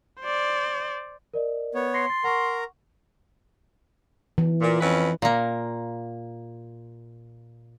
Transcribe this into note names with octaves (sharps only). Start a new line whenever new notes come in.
C5 D5
A#4 D5 D#5
B3 C#5
C6 A#6 C7 C#7
A6
A#4 F#5 A#5 C#6
E3
A#2
F2 C#4 B4
A#2 A#3